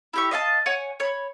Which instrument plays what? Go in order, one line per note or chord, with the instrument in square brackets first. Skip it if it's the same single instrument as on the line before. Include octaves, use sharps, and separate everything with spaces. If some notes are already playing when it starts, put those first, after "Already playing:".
[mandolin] E4 G4 C#6
D#5 F5 G#5 A5
C#5 F#5 G#5
C#5 B5